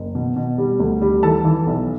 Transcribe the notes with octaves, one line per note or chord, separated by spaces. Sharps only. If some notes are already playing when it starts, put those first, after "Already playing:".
Already playing: F#1
B2
B2
G3
D2
G3
E3 A4 A5
E3
B1